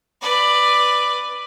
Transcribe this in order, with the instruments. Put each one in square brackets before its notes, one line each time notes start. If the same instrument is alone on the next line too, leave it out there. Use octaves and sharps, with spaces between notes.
[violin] B4 D5